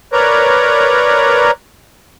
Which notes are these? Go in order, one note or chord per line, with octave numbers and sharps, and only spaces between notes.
A#4 B4 C#5 D5 A#5